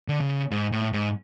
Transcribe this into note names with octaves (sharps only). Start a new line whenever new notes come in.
D3
C#3
G#2
A2
G#2